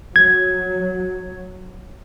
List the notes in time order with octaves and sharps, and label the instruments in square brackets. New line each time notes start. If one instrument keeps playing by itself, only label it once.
[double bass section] F#3 [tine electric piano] G#6